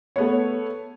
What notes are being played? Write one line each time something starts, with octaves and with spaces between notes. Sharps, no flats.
A3 B3 C#5